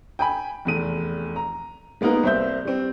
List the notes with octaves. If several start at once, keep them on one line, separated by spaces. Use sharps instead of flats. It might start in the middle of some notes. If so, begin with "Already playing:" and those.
G5 G#5 B5
F1 E2 D#7
A#5
G#3 A#3 B3 D#4 A#4
C2 C5 E5 G6
G3 C4